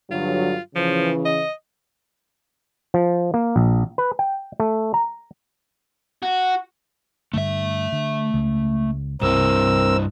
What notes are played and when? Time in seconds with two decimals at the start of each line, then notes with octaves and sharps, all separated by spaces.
0.11 G2 D3 F#3 F4
0.75 C#3 E3 F3
1.25 D#5
2.94 F3
3.34 A#3
3.56 A#1
3.98 B4
4.19 G5
4.60 A3
4.94 A#5
6.23 F#4
7.34 G2 D3 A3 E5
7.92 D3
8.34 C#2 C#3
9.21 C2 G2 C4 E4 A#4 E6